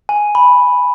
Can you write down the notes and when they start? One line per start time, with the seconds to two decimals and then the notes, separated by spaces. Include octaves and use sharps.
0.09 G#5
0.35 B5